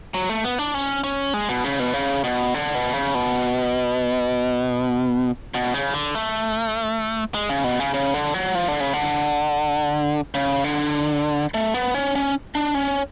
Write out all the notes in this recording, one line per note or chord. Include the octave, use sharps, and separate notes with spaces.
F#3
A3
B3
D4
C#4
C#4
G#3
B2
C#3
B2
C#3
B2
D3
B2
C#3
B2
B2
C#3
D3
A3
G#3
C#3
B2
C#3
C#3
D3
F#3
F3
D3
C#3
D3
C#3
D3
A3
B3
C#4
C#4
D4
C#4